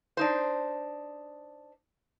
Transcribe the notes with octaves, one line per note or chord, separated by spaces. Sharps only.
D4 D#4 C5